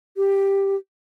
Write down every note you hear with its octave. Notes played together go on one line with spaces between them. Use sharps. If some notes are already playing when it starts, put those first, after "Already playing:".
G4